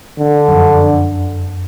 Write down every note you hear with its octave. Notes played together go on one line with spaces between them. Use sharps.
D3
F#2
F2